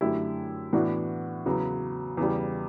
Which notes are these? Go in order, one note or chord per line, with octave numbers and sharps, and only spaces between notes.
F#2 D3 A3 E4 G4
A2 E3 B3 D4 F#4
E2 C#3 F#3 B3
E2 C#3 G3